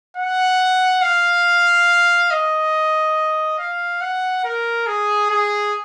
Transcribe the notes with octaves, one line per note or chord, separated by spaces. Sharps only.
F#5
F5
D#5
F5
F#5
A#4
G#4
G#4